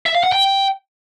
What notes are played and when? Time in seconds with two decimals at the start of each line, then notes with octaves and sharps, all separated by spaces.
0.06 E5
0.15 F5
0.24 F#5
0.32 G5